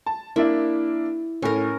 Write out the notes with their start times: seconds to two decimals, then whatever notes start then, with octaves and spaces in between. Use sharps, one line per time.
0.06 A5
0.36 A#3 D4 E4 E5
1.42 A2 C#4 A#4